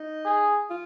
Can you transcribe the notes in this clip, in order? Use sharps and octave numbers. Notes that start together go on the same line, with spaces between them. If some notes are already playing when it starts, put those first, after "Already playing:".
Already playing: D#4
G#4
F4